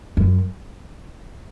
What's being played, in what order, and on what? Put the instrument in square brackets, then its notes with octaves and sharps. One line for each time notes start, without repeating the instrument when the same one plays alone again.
[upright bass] F#2